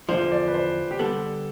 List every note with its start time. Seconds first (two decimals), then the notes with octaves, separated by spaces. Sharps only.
0.09 E2 D3 F3 C5
0.32 D5
0.47 B4
0.54 C5
0.91 G4
0.99 D3 G3 B3 A4